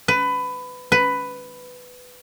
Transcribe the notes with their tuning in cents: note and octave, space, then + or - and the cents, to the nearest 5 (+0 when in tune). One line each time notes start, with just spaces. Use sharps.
B4 +20
B4 +10